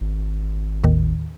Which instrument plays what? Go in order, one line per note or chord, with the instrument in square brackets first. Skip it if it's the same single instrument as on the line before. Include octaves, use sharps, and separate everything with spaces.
[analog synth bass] G#1
[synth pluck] D#2 A2 D#3